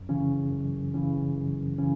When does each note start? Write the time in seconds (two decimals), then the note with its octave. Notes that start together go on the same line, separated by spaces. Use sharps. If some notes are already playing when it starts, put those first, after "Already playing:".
Already playing: F#2
0.09 C#3 E3 C#4
0.51 F#2
0.94 C#3 E3 C#4
1.37 F#2
1.79 C#3 E3 C#4